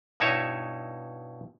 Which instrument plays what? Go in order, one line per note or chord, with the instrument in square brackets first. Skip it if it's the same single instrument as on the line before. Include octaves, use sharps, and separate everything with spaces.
[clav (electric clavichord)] G2 B2 D#4 E4 C#5 E5